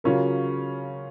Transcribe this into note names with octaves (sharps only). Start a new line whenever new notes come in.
C#3 F#3 C#4 F4 A#4